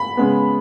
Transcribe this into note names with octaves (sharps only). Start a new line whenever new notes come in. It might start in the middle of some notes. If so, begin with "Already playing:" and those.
Already playing: B5
C#3 G#3 B3